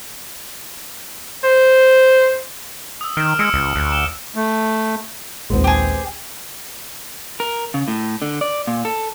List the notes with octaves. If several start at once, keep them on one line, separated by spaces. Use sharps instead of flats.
C5
D#6 E6
D#3 F6 D7 E7
G#3 E6 C#7 D7
C#2
D2 F#6
D6 E7 G7
A3
A#1 D#2 G#3 B3 C4
G4 G#4
A#4
C#3
A2
D3
D5
A#2
A4